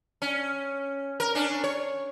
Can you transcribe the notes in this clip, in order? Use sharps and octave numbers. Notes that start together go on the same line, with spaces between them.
C#4
A#4
C#4 D4
C#5